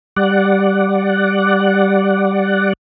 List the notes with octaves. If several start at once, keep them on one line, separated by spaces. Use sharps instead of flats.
G3 D5 F#5